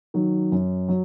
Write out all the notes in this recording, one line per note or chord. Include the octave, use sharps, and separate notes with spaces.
D#3 F#3
F#2
F#3